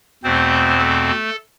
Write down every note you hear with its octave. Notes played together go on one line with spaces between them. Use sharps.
E2 B2 A3 C4 C5
A3 A4